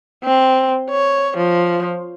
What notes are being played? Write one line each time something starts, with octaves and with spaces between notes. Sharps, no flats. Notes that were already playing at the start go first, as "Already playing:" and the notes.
C4
C#5
F3